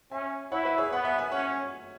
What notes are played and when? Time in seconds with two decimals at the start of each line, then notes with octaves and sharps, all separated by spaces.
0.11 C#4 E5 G#5
0.52 E4 C#5 F#5
0.65 B4 E5
0.78 G#4 C#5
0.92 B3 C#5 F#5
1.05 E5 G#5
1.18 E5 G#5
1.32 C#4 C#5 F#5